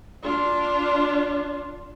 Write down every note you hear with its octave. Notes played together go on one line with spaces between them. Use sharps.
D4 F4